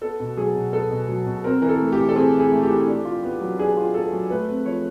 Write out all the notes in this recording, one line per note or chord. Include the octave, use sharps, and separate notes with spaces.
B3 A4
B2
F#3 G#4
B2
B3 A4
B2
F#3
B2
C4 A#4
E3 A#4
A4
A3
G4
E3
A4
C4 G#4
E3
G#4
A3
G4
E3
D4
F4
B3
F#3
D4 G#4
F4
B3 A4
F#3
A3 B4
C4
F3 C#5